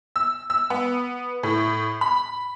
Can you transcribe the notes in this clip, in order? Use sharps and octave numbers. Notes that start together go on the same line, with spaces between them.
E6
E6
B3
A2
B5